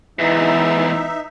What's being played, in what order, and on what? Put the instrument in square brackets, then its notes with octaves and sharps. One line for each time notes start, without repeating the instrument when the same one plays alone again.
[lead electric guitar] E2 G#2 [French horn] E3 [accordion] D#4 E5